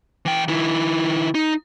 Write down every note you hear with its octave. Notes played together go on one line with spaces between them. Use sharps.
E3 G5
D#3 E4
D#4